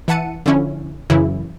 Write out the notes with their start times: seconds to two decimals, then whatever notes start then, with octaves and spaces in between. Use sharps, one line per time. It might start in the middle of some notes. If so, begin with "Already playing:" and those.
0.08 E3 E5 F#5 A5 C#7 D#7
0.46 D3 F3 C#4 E4
1.10 F#2 C#3 E3 E4